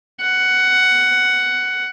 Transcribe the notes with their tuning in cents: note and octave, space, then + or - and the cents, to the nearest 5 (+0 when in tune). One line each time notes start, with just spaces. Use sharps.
F#5 +10